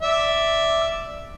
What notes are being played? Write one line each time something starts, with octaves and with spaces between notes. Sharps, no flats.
D5 E5